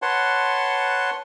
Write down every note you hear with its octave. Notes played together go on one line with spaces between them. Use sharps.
B4 C#5 F#5 A5 C6